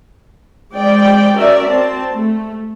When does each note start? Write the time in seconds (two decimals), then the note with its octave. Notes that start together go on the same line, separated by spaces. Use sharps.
0.72 G#3 C4 D5 G5
1.34 C#4 F#4 A#4 D5 E5
1.69 C4 A5
2.12 A3